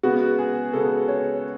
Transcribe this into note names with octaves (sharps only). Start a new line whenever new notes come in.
C#3 G#3 B3 F#4
G#4
C#3 G#3 B3 A4
C#5